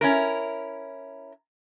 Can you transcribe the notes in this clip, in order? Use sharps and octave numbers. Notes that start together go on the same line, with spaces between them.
C#4 E4 A#4